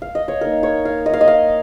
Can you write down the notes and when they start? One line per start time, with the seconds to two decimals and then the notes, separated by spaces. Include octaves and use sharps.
0.02 F5
0.15 D#5
0.28 C#5
0.41 A#3 D#4 A#4
0.63 C#5
0.85 F5
1.06 D#5
1.14 F5
1.21 D#5
1.28 F5